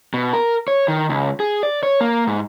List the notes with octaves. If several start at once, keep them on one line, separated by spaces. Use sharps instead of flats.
B2
A#4
C#5
D#3
C#2
G#4
D5
C#5
A#3
G#2